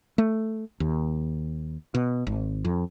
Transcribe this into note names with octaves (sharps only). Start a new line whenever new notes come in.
A3
D#2
B2
G#1
F2